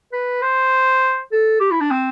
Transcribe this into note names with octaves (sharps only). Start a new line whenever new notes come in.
B4
C5
A4
G4
E4
D4
C4